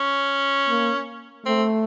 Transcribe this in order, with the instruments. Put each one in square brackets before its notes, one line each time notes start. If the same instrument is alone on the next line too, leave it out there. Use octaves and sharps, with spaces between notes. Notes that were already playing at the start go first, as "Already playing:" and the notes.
Already playing: [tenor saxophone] C#4
[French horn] A#3
[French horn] A3 [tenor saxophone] C4